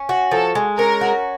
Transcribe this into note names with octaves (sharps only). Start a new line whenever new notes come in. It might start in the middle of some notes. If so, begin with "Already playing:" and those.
Already playing: C#4
F#4
F3 A4
G#3
C#4 A#4
F#4